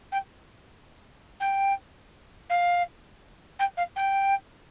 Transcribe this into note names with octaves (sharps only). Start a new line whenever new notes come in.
G5
G5
F5
G5
F5
G5